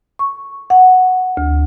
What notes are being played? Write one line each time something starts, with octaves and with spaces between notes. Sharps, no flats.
C#6
F#5
D2